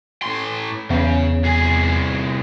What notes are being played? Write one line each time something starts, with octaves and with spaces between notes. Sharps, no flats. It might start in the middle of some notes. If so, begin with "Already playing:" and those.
A2 C6
E2 C#3
C2 G#4